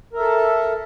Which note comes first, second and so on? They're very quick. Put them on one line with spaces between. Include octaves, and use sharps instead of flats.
A#4 E5 A4 A5